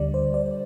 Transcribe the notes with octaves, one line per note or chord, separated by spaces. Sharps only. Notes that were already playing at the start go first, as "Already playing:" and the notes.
Already playing: D2 D3 G3 D5
C5
D5